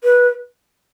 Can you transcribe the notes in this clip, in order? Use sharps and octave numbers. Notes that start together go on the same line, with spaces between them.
B4